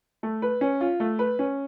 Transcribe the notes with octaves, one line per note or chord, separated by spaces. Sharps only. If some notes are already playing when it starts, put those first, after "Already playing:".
A3
B4
C#4
F4
A3
B4
C#4